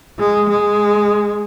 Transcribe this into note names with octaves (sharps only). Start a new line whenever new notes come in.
G#3
G#3